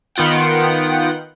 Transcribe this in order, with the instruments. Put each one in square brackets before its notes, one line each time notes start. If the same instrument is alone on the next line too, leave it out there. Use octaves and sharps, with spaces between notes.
[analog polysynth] D#3 B3 F4 F#5 G5